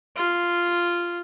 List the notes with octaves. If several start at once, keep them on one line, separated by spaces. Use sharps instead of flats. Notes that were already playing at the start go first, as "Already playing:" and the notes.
F4